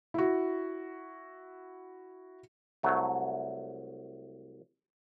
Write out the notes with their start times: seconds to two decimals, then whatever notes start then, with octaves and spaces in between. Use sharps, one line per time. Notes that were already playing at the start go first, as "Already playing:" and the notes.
0.14 E4 F#4
2.83 C2 F#3 A3